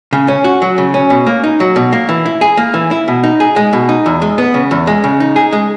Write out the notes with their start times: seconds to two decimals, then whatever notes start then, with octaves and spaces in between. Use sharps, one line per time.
0.13 C#3
0.28 C#4
0.44 F#4
0.62 F#3
0.78 C#3
0.94 C#4
1.10 B2
1.26 A#3
1.44 D#4
1.60 F#3
1.76 B2
1.92 A#3
2.09 E3
2.26 E4
2.41 G#4
2.57 A#3
2.74 E3
2.91 E4
3.08 B2
3.24 D#4
3.40 G#4
3.56 G#3
3.73 B2
3.89 D#4
4.06 E2
4.22 G#3
4.38 B3
4.54 C#3
4.71 E2
4.87 G#3
5.04 C#3
5.20 D#4
5.36 G#4
5.53 G#3